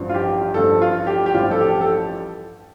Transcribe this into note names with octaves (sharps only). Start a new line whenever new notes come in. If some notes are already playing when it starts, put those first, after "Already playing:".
Already playing: A1 G2 F3
F4
G4
A1 G2 F3 A4
F4
G4
G4
A1 G2 F3 F4
A4
G4
A4